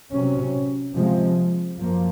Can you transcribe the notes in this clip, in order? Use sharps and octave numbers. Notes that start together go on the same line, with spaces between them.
C3 F#3 C#4
C3 F3 G#3
F#2 F3 A#3